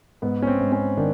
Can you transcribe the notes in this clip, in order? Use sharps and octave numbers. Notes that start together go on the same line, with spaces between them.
G#2 B3
C#4
C4
G#2
C#4
D#3 D4